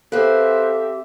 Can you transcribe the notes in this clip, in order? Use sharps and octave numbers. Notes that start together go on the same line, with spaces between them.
C4 G4 A4 B4 C5 E5 F5